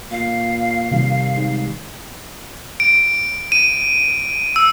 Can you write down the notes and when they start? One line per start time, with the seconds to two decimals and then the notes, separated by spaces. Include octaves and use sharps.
0.11 A#2 F5
0.91 C3 D#3 G3
1.36 G#2
2.80 D7
3.52 D#7
4.56 E6